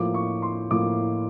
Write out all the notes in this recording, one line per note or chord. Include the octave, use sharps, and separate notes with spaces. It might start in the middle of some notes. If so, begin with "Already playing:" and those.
Already playing: A2 F3 A#3 D6
C#6
C6
A2 F3 A#3 D6